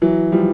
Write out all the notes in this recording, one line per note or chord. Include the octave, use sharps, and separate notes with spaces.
E3 F#3
F3 G3